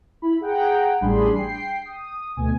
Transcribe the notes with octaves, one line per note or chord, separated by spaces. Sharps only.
E4 B5
G#4 F#5 G5 A#5
A1 G3 D4 G#4 B5 C6
G5 C7
D#6
D2 B2 G#5